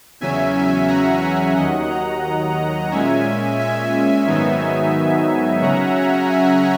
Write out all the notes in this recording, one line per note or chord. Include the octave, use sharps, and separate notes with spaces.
E2 C#3 F#3 C#4 E5 G#5
E5 G#5
F#5 A#5
E5 G#5
D#2 D#3 F#3 D#5 F#5
F#5 A#5
A#2 G#3 C#4 E5 G#5
E5 G#5
G#2 D#3 F#3 B3 D#4
C#3 F#3 C#4 F#5 A#5
F#5 A#5
E5 G#5